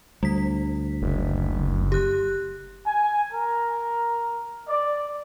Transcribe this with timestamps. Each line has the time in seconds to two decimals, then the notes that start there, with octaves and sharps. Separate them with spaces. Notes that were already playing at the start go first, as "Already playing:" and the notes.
0.23 D2 G3 B6
1.02 F#1
1.92 G4 F#6
2.87 G#5
3.32 A#4
4.67 D5